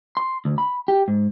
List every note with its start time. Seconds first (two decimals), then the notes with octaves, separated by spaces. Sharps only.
0.17 C6
0.45 D2
0.58 B5
0.88 G4
1.08 G#2